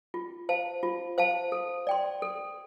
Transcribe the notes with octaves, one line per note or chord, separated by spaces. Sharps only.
F4
C5 F5 A5
F4
C5 F5 A5
A4
D5 G5 C6
A4